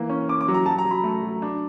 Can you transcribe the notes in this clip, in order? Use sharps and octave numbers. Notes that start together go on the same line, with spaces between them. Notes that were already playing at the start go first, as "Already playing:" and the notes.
Already playing: E3 A#3
C#4
C#4 D6
D6
F#3
A#5
F#3 A5
A#5
F#3
B5
A3
F#3
D4